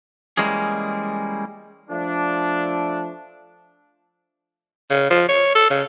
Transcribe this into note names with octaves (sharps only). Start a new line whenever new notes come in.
E3 G3 G#3 A#3 C#4 G#4
F3 A3 D4
C#3
F3
C#5
A4
C#3